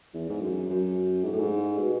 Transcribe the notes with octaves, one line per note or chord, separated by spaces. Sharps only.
E2
G#2
F#2
F#2
G#2
A2
G#2
B2